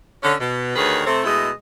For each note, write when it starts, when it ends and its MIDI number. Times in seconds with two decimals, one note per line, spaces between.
0.23 0.35 50
0.23 0.35 61
0.40 0.73 47
0.76 1.02 38
0.76 1.02 51
0.76 1.02 68
0.76 1.02 71
0.76 1.02 73
1.07 1.22 48
1.07 1.22 57
1.07 1.22 60
1.24 1.50 47
1.24 1.50 56
1.24 1.50 57
1.24 1.50 64
1.24 1.50 75